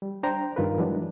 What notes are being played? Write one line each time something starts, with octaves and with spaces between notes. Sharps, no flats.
G3
D4 C5 G5 A#5
G2 D#3 F4 A#4 B4
E3 F#3 G#3 D4